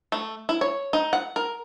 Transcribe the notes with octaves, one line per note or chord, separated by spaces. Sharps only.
A3
E4
C#5
D#4
F#5
A#4